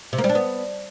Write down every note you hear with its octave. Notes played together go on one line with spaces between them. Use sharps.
C3
A#3
G3
D4
B3